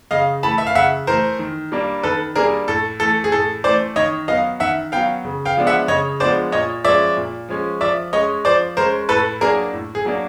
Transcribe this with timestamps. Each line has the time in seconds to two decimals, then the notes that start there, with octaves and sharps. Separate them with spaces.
0.11 C#3 D#5 F5
0.43 E3 A3 A5 B5
0.58 E5
0.67 F5
0.75 C#3 E5 F#5
1.07 E3 A3 A#4 C5
1.39 D#3
1.72 G3 A#3 D4
2.03 D#3 A4 B4
2.35 G3 A#3 D4 G#4 A#4
2.68 A2 A4
3.00 E3 A3 A4
3.24 G#4
3.32 A2 A4
3.64 E3 A3 C5 D5
3.96 D#3 C#5 D#5
4.28 F#3 B3 D#5 F5
4.60 D#3 E5 F#5
4.92 F#3 B3 F5 G5
5.25 C#3
5.45 F5 G5
5.56 F3 G#3 B3 D4
5.67 E5 F#5
5.88 C#3 C#5 D#5
6.20 F3 G#3 B3 D4 C5 D5
6.52 A#2 C#5 D#5
6.84 F3 G#3 C#4 D5 E5
7.17 A#2
7.49 F3 G#3 C#4
7.81 F3 D5 E5
8.13 G#3 C#4 C#5 D#5
8.45 F3 C5 D5
8.77 G#3 C#4 A#4 C5
9.09 A2 A4 B4
9.41 F#3 A#3 D4 G#4 A#4
9.73 A2
9.95 G#4
10.05 F#3 A#3 D4